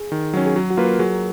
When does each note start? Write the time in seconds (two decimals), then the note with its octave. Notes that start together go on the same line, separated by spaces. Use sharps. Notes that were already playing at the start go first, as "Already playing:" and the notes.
Already playing: G#4
0.12 D#3
0.34 F#3 C#4
0.46 G#4
0.56 F#3 F#4
0.70 F#4
0.77 A#3 F4 B4
0.85 A#4
0.99 F#3 G#4